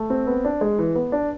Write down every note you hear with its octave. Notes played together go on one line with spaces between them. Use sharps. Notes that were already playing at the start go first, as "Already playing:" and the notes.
Already playing: A3
C4
B3
D4
G#3
E3
B3
D4